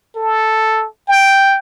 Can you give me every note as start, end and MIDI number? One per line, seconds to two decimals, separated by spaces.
0.16 0.87 69
1.08 1.58 79